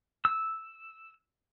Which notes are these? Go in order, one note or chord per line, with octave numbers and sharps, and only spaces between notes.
E6